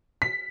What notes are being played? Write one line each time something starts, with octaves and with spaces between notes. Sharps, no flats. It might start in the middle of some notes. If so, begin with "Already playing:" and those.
B6